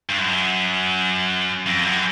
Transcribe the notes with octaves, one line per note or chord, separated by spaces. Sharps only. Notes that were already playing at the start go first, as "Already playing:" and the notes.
G2
F#2
F2
F#2